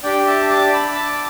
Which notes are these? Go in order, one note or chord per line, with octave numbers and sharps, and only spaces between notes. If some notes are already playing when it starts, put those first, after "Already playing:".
D4 G4 D5 G5
E5 A5
A5 D6
B5 E6
A5 D6